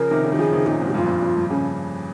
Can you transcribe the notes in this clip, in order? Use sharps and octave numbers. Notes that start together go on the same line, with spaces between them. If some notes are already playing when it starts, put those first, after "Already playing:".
Already playing: C#3 F3 A#4
C3 D#3
C#3
D#3 G4
C#3 F3 G#4
C3 D#3
A#2 C#3 D#4
G#2 C3
G4
G2 A#2 F4
F2
G2
F2
G2
C#3 C#4